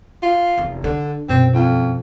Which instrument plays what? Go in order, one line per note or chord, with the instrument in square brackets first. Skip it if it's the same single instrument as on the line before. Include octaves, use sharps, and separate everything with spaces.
[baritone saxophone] F4
[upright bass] F1 E2
[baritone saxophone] D3 [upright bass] D4
[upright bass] F#2 B2 [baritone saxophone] C4
[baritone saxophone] F2